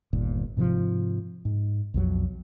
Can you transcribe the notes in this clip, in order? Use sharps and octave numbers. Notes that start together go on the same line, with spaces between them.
G1 D#2 A#2
G#2 C3 E3 F3
G#2
B1 F2 F#3